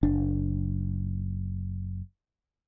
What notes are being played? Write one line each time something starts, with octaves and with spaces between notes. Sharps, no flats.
F#1 D4